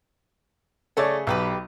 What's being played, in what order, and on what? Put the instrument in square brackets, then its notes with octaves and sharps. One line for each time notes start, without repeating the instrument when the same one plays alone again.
[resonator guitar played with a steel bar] C#3 A3 G#4 [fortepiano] A4 C#5 D5
[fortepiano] B1 [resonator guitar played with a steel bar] D#3 G4 B4